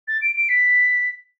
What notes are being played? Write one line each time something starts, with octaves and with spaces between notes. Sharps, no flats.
A6
D7
D7
B6